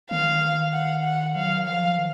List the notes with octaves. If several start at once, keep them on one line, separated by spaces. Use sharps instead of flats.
D#3 F5
F#5
F#5
F#3 F5
F3 F5
D#3